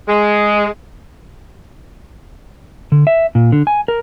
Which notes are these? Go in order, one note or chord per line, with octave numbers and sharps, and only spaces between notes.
G#3
D3
E5
A#2
D3
G#5
A#4